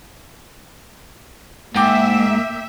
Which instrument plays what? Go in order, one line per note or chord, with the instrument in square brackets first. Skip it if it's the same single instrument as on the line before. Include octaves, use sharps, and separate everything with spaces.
[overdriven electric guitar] G#2 [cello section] A#3 E5 [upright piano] G5 D6